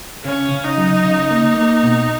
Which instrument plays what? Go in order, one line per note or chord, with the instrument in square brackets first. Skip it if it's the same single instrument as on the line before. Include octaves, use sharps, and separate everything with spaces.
[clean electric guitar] C#3 [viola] C#4
[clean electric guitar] C#3
[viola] D#4
[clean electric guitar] F#3
C#3
A#3
A#3
B2